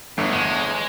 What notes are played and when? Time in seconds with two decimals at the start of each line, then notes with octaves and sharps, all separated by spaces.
0.18 G1 E2
0.33 G#3